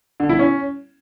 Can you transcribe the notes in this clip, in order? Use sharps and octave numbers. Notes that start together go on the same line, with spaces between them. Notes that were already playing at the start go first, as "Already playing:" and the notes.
D3
E4
C#4